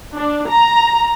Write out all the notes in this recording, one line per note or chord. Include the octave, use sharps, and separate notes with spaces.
D4
A#5